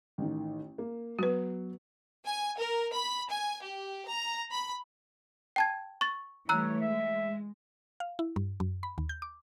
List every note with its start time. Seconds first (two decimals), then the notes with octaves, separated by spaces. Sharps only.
0.18 A1 D#3
0.78 A#3
1.19 F#3 B3 F#4 B4
2.26 G#5
2.58 A#4
2.92 B5
3.30 G#5
3.62 G4
4.07 A#5
4.51 B5
5.56 G5 A5 G#6
6.01 C#6 A6
6.49 E3 G3 A3 C#5 A#5 E6 F#6
6.81 G#3 E5
8.00 F5
8.19 E4
8.36 G2
8.60 F#2
8.83 B5
8.98 D#2
9.09 G6
9.22 D6